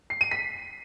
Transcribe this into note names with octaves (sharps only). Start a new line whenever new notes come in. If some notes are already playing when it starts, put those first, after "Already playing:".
C7
D#7
B6